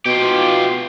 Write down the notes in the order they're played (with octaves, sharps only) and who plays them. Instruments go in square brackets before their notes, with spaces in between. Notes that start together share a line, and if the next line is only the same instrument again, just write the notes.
[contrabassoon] B2 [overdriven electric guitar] F4 G4